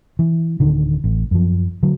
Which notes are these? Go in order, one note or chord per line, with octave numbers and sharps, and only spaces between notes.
E3
D1 D3 D#3
A1
F#2 F3
D3 F#3